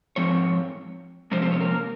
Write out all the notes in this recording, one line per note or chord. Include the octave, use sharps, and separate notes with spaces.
G#2 F3 C4 C#5
C3 F3 G#3 C#4 C5
C4 C5
C#4 C#5
A#3 A#4